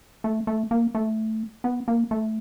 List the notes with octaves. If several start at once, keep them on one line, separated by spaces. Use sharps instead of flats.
A3
A3
A#3
A3
B3
A#3
A3